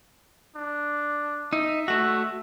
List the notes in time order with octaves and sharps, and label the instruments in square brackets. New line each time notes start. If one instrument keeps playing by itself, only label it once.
[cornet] D4
[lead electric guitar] D#4 [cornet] E5
[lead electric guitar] A3 F#4